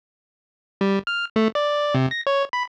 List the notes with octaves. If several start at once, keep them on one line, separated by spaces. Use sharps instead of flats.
G3
F6
A3
D5
C3
A#6
C#5
B5